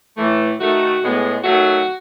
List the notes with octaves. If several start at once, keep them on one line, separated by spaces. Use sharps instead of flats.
A2 E3 A3
D#3 A3 F#4
A2 G#3 B3
D#3 F#3 A3 F#4